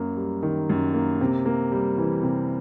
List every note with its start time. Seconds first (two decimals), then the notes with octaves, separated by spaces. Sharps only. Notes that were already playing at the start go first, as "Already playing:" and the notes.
Already playing: F#2 A#3
0.17 G3
0.43 D#3
0.70 F#2
0.94 A#3
1.21 C3
1.46 A#3
1.72 G3
1.98 E3
2.23 C3